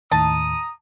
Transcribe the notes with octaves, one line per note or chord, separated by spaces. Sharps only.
D#2 A2 D#3 A5 A#5 D#6